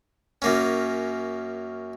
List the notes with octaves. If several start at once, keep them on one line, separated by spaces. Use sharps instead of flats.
F#2 A#3 C#4